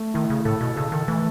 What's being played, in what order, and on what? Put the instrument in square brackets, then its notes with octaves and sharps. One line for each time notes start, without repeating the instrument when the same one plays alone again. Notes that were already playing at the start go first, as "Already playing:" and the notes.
Already playing: [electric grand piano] A3
[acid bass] D#3 [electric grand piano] E4
[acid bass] C#3
[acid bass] A2 [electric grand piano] A4
[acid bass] B2
[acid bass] C#3 [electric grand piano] A4
[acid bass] D#3
[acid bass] E3 [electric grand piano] A3